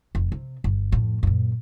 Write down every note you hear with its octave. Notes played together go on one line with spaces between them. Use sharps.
F1
C3
G1
F2 A2
F#2 A#2